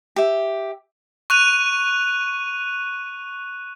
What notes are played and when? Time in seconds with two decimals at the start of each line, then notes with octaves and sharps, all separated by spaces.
0.16 G4 E5
1.30 C#6 F#6 D#7 F7